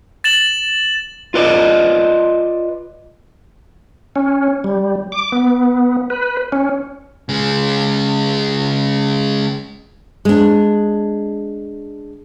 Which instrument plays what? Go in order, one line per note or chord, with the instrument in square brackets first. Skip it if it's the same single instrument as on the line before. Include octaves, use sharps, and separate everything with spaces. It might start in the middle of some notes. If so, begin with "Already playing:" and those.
[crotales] A6 E7 F#7
[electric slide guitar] F4 B4 D5 D#5
[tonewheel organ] C#4
G3
D6
B3
B4
C#4
[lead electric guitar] C#3 G#3
[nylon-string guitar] G#3 D4